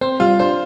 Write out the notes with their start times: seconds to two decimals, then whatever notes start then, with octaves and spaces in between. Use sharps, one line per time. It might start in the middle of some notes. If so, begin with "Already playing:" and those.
0.01 C4 C5
0.20 G3 F4
0.39 D4 C5